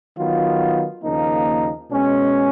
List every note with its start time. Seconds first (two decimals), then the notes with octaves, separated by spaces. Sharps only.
0.15 D#3 F#3 B3 F4
1.02 D#2 C#3 F3 A#3 D#4
1.89 B2 G#3 C#4